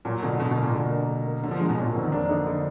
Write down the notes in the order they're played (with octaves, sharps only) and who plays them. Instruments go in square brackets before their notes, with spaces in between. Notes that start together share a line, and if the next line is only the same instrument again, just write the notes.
[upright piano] A#2 [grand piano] F#3
[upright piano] B2 [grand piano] D3
[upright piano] B2 [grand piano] D3
[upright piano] B2
[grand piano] A#3
[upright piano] A#2
[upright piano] B2 [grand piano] D3
[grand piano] A#3
D3
A#3
[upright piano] D3 [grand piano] F#3
[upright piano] F3
[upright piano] G#3 [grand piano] A#3
[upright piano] B2
[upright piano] A#2 [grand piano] F#3
[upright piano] B2
[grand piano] F2 [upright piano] D3
[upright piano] D#3
[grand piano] A#3 [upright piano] D4
[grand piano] D3 [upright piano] D#4
[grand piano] D3